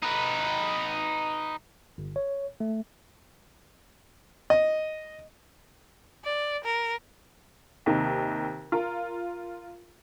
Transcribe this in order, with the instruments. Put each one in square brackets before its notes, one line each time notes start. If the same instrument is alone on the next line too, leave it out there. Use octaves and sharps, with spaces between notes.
[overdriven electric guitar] D#4 B4
[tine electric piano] G1
C#5
A3
[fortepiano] D#5
[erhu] D5
A#4
[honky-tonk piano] D#2 C3 D#4
F4 A#4